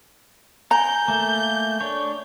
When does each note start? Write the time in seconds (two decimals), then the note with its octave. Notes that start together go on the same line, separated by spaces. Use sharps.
0.71 G#5 A#5 G6
1.08 A3 A#3
1.80 D4 C#5